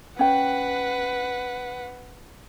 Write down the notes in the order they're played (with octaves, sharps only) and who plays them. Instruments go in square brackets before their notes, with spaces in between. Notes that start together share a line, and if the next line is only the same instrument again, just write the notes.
[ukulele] C#4 G5 [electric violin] B4 F#5